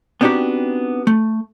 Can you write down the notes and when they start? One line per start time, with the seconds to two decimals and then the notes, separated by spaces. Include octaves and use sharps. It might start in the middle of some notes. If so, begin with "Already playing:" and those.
0.21 B3 C4 D4 D#4 F#4 G4
1.07 A3